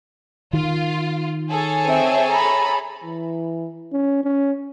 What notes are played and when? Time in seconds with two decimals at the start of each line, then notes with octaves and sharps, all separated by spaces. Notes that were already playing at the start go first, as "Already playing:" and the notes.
0.53 D#3 F4
1.50 G#4 A4 C#5
1.86 C4 E5
2.31 A#5 B5
3.04 E3
3.92 C#4
4.24 C#4